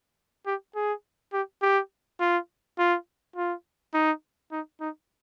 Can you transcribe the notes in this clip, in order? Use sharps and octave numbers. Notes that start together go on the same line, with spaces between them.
G4
G#4
G4
G4
F4
F4
F4
D#4
D#4
D#4